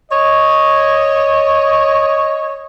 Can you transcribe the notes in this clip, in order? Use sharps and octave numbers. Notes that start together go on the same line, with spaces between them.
C#5 D#5